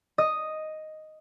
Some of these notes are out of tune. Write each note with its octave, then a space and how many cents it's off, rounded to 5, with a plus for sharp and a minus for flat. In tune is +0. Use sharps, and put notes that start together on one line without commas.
D#5 +0 D#6 +0